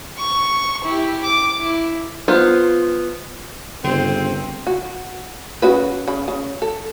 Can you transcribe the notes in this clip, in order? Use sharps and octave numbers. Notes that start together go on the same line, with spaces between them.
C#6
E4 G4
D6
E4
B3 F4 C5
G1 C#3 C4
F#4
C#3 F#4 B4
C#3 B5
C#3
A4